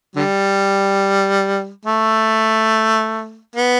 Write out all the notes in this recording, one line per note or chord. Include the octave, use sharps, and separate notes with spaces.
D3 G3
A3
B3